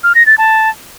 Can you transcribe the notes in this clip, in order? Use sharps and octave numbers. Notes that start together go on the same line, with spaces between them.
F6
A#6
A6
A5